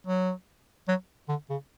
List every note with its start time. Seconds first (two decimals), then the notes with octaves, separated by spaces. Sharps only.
0.07 F#3
0.89 F#3
1.29 D3
1.50 C#3